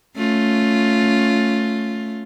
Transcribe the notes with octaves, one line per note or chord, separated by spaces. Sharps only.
A3 C#4 F4